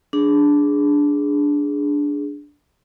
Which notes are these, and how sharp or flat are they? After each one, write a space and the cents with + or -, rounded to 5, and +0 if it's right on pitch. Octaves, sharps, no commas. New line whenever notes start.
D4 -10 G#4 +0